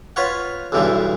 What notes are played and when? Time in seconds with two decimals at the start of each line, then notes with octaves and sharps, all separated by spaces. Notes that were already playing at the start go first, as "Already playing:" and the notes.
0.16 F4 B4 C#5 F#5
0.72 B1 E2 G2 D3 E3 G3